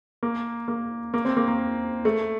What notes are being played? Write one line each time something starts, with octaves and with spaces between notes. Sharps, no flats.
A#3
A#3
A#3
C4
A#3
A#3
A3